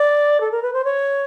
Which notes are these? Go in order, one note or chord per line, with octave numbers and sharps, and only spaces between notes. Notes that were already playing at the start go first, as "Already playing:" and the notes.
Already playing: D5
A4
A#4
B4
C5
C#5